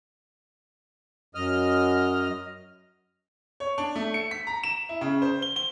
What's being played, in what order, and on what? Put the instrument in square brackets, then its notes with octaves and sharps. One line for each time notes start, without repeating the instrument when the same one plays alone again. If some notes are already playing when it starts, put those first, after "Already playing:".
[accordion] F#2 D#5 F6
[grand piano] C#5
D4
A3
C#7
B6
A#5
E7
E4
C#3
C5
G7
G7